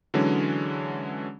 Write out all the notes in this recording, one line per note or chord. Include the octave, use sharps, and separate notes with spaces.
D3 E3 F#3 G#3 C#4 D4